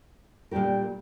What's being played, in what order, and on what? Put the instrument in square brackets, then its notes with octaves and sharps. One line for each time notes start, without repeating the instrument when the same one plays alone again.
[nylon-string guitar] A#2 G3 D4 G4 A#4